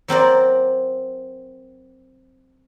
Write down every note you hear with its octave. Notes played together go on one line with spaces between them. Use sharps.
F#3 C4 A#4 D5